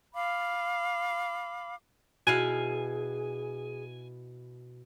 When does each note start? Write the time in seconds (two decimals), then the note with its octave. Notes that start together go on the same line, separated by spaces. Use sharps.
0.13 F5 B5 D6
2.27 B2 E4 F#4 G#4 F5 G#5 F#6